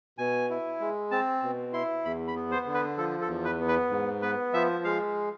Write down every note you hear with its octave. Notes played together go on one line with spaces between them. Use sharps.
B2 G#5
E4
G#3
C4 A5
B2
E4 C6
E2 B5
B5
B3
C5
D3
B4
F3 A4
A4
E2
B4
B3
B4
G#2
B3 B4
F3 E5
G#3 F5